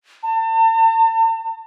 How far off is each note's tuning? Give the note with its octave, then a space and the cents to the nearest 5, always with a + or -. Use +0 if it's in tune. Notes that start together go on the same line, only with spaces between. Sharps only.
A5 +40